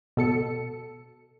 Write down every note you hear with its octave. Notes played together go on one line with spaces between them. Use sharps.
B2 A4 C#7